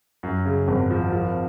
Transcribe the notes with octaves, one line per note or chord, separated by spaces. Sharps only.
F#2
C#3
G#1
F3
F3